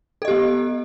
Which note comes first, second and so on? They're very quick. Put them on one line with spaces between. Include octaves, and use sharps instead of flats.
A4 D#5 G4 B3